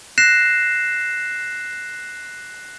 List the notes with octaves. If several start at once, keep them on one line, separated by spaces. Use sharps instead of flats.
F#6 A#6 C7 E7